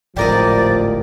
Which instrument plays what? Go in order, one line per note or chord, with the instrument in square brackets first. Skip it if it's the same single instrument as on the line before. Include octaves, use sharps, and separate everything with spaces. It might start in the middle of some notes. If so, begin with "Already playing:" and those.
[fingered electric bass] D1 G#1 A2 [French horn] F3 [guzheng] G4 A#4 D#5 [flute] D5